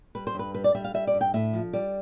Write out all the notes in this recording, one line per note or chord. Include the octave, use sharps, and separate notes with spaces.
G3 B4
C5
G2 B4
G3 B4
D5
G3 E5
F5
G3 E5
D5
G2
G5
A2 E5
F3
G3 D5